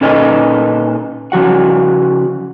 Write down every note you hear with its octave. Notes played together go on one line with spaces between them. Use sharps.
A#2 C#4 D#4 A4 B4 D#5
C#3 F3 F#4 F#5